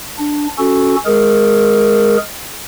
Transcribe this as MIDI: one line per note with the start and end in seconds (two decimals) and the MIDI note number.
0.19 0.47 62
0.58 0.96 61
0.58 0.96 66
0.58 0.96 69
1.06 2.17 56
1.06 2.17 68
1.06 2.17 70